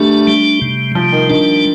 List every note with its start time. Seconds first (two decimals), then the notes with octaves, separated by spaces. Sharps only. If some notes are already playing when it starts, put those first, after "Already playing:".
Already playing: G3 A3 D4
0.27 G3
0.62 C3
0.95 F3 G3
1.12 D#3
1.29 D#3 D4